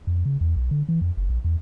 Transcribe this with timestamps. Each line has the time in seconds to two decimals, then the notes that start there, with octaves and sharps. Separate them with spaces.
0.07 F2
0.26 C#3
0.41 E2
0.56 B1
0.71 D3
0.89 E3
1.01 F2
1.17 F#1
1.30 A#1
1.44 E2